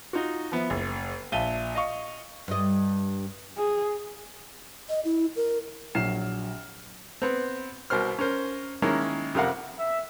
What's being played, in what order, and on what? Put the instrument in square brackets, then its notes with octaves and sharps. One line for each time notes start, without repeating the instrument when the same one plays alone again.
[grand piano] D#4 F4 F#4
F3 B3 E5
F#1
A#1 E5 F5 A5 D#7 G7
D#5 F5 C#6
[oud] G2 D#5
[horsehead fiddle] G#4
[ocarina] D#5
E4
A#4
[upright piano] A#1 F#3 F6 C7 E7
[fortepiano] B3 C4
C2 B2 A#4 C5 F6
C#4 A#4 C5
D#3 G#3 A#3 C#4 E4
F2 C3 A#4 F5 F#5
[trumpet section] E5